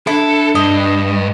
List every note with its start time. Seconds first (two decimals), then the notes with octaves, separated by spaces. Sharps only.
0.07 D4 E4 A4
0.55 G2 D#5